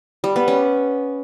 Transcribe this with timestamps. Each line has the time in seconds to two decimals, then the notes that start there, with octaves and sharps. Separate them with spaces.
0.24 G3
0.36 B3
0.48 C#4